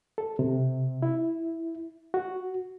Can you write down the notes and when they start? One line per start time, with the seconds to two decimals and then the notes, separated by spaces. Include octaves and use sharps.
0.18 A4
0.39 C3
1.02 E4
2.14 F#4